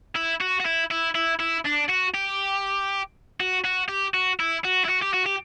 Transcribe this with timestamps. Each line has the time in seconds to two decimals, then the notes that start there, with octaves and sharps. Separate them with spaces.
0.16 E4
0.41 F#4
0.60 F#4
0.66 E4
0.91 E4
1.15 E4
1.40 E4
1.66 D4
1.89 F#4
2.14 G4
3.40 F#4
3.65 F#4
3.89 G4
4.14 F#4
4.40 E4
4.64 F#4
4.84 E4
4.89 F#4
5.02 G4
5.13 F#4
5.26 G4